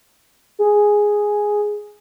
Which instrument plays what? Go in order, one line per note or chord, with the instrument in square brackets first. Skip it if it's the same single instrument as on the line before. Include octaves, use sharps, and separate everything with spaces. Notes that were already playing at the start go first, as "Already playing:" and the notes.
[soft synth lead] G#4